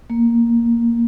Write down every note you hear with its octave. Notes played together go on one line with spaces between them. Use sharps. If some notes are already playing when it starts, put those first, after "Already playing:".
A#3